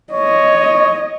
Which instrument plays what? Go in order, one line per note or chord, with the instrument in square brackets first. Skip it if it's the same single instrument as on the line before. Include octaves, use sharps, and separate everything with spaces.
[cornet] C#5 [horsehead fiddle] D#5